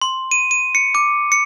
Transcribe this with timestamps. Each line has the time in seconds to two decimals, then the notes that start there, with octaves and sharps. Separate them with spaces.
0.02 C6
0.31 D#7
0.51 D#7
0.75 C#7
0.95 D6
1.32 C#7